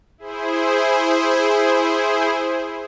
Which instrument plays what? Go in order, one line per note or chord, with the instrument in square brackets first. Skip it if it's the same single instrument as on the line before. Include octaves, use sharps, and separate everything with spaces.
[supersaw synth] E4 G#4 C5